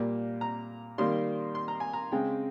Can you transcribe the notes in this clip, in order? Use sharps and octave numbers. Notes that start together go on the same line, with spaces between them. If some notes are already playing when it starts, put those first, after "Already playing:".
Already playing: A#2 G3 A#3
A#5
D#3 G3 A#3 C6
C6
A#5
G#5
A#5
C#3 G#3 C4 G5